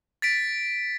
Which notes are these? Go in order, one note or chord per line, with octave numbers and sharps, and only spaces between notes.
A6 B6 D7